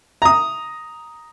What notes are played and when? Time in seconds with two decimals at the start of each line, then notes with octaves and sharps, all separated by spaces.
0.22 A#5 D#6